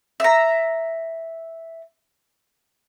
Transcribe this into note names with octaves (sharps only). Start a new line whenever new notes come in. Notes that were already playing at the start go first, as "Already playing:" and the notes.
E5 A#5